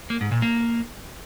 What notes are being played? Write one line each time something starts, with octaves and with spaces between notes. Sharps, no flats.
A#3
G#2
A#2
A#3